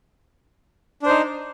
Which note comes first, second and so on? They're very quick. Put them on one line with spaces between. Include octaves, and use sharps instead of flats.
D4 C5 D#4